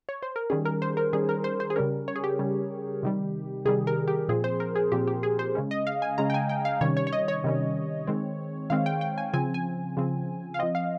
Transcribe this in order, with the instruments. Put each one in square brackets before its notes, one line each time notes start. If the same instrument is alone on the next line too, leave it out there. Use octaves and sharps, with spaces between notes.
[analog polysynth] C#5
C5
A#4
D#3 G3 C#4 G#4
A#4
C5
A#4
D#3 G3 C#4 G#4
A#4
C5
C5
G#4
C#3 G3 C#4 A#4
C#5
G#4
G4
C#3 G3 C#4
C3 D#3 G3
C3 D#3 G3 G#4
A#4
G4
A#2 F3 C4 G#4
C5
A#4
G#4
A#2 F3 C4 G4
G4
G#4
C5
C#3 G#3 C#4
D#5
F5
G#5
C#3 G#3 C#4 A#5
G5
G#5
G5
F5
C3 D#3 G3 C#4 C#5
C#5
C#5
D#5
C#5
C3 D#3 G3 C#4
D#3 G#3 C4
D#3 G#3 C4 F5
G5
G5
G#5
C#3 F3 C4 G#5
G#5
C#3 F3 C4
F5
F3 C4 D#5
F5